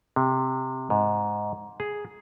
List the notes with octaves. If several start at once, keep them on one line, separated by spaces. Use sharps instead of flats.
C3
G#2
G#4